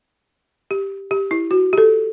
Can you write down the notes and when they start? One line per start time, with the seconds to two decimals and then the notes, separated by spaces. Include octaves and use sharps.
0.71 G4
1.11 G4
1.31 E4
1.51 F#4
1.73 G4
1.78 A4